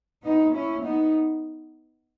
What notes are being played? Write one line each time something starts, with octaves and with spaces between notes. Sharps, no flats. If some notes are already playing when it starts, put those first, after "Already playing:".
B3 D#4
C#4 E4
B3 D#4